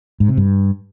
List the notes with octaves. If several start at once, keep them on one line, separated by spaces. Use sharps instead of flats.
G#2
C3
G2